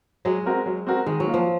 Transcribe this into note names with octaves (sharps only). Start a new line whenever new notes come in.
F#3 G#3
C4 F#4 A#4
F#3
C4 F#4 A#4
D#3 G#3
F#3
A#3 F4
F3